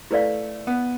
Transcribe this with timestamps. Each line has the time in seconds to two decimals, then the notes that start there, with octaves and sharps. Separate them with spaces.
0.11 A3 E4 B4 D5 F5
0.67 B3